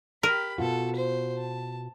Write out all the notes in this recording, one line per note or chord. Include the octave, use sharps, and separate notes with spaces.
G4 A#4 B5
B2 F4 F#4 A4
C5
A5